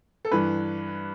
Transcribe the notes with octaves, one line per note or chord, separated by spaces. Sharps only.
A4
G2 E3 B4